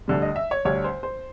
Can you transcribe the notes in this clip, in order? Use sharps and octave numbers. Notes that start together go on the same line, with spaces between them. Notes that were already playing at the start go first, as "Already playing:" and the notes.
D2 D3 G3
D#5
E5
C#5
D2 D3 G3 C#5
C5
C5